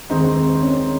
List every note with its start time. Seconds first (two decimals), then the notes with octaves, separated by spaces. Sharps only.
0.10 D#2 D#3 G#3 C4 D#4
0.36 C4
0.54 C4
0.61 C#4